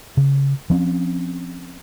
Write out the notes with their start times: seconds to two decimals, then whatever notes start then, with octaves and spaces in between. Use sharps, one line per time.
0.17 C#3
0.70 F3 C4 C#4